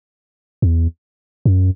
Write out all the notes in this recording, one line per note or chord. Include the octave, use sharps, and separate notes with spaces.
E2
F#2